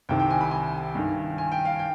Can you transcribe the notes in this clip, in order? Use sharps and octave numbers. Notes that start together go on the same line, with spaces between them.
C2 C3 D#3 G5
G5
G#5
B5
G#5
G2 D#3
G#5
G5
F5
G5